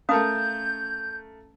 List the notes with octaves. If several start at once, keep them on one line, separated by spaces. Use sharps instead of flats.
A3 C#4 A#4 F5 A5 D#6 G6